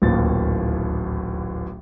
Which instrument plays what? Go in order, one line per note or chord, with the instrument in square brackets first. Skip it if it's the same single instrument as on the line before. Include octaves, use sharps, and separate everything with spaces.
[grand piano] D1 A1 D#2 A#2 A6